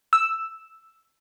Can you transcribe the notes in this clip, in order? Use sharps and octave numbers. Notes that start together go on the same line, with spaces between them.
E6